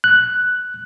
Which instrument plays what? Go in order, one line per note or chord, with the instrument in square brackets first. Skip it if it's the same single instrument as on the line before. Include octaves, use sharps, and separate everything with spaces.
[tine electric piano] F#6